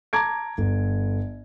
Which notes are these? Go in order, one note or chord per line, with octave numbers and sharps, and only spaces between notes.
A5 A#5 D6 G#6 D7
G1